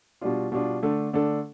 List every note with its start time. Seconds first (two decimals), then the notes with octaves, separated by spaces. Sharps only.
0.21 B2 G3 D4 F4
0.52 B2 G3 D4 F4
0.83 D3 A3 D4 A4
1.13 D3 A3 D4 A4